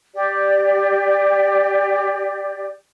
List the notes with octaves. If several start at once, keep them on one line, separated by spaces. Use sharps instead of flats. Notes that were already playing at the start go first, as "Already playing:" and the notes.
G4 D5